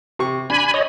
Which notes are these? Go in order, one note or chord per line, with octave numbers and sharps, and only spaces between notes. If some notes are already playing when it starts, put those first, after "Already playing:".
C3 C#6
D4 G#5 B5
C#5 D#5